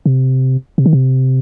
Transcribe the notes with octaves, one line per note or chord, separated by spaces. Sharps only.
C3
C3
D#3
C3